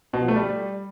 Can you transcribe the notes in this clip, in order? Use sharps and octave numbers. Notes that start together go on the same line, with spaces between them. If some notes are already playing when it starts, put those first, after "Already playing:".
B2
F3
A3
G3